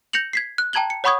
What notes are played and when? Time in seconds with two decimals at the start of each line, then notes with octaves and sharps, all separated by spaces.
0.13 G6 A#6 C#7 F7 F#7
0.33 G#6 B6 C7
0.58 F#6
0.73 G5 A5 A#5 G#6 F#7 G7
0.90 C#7
1.04 C#5 F#5 B5 C#6 D#6 G#6